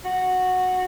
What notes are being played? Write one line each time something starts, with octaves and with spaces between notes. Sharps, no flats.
F#4